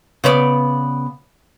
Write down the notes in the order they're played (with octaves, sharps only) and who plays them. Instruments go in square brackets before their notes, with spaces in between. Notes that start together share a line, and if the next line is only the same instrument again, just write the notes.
[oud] C#3 B3 D5